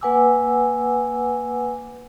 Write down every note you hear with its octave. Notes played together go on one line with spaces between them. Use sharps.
A#3 B4 F#5 G#5 D6 E6